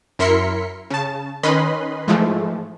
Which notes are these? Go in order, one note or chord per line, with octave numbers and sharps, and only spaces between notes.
F#2 E4 A#4 C6 B6 C#7
C#3 A5
D#3 C#4 B4 D#5 B5 C6
G#2 E3 F3 G#3 A3